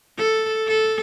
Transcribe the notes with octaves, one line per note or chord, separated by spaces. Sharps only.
A4
A4